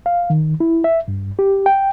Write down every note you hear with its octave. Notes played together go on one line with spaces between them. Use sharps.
F5
D#3
E4
E5
G2
G4
G5